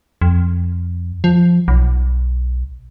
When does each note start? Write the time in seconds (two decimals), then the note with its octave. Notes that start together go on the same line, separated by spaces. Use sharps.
0.22 F2
1.24 F3
1.68 B1